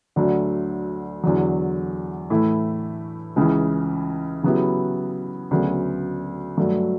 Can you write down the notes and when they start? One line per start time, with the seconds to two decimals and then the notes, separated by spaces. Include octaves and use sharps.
0.16 D2 D3 F#3 A3
1.23 E2 D3 F#3
2.30 A2 E3 A3 E4
3.36 C#2 C#3 E3
4.43 C#3 F#3 B3 E4 G4
5.51 D2 C#3 F#3 B3
6.57 G2 F#3 A3